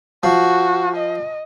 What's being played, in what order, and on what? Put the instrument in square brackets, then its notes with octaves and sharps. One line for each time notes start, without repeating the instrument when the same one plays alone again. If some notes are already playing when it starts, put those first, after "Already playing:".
[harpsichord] F3 [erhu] F#4
[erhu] D#5